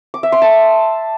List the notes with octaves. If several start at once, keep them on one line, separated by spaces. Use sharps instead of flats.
D6
E5
C6
A5